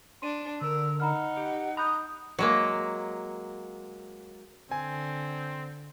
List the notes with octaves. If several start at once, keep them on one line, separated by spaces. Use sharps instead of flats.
D4 C6 D#7
D3 A#4 E6
D#4 F#5 A#5 B5 F6
G4
A#5 B5 D#6 F#6 G6
F#3 G#3 A#3
D3 C4 G#5